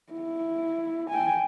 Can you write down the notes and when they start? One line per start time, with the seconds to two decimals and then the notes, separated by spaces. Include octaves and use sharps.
0.13 E4
1.10 G5 G#5